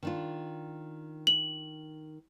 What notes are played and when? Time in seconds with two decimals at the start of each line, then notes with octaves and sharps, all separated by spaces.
0.03 D#3 D4 F4
1.27 F#7